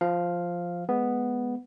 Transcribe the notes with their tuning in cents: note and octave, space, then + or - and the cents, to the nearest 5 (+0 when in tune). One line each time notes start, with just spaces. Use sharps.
F3 +0 F5 +0
G#3 +15 B3 +0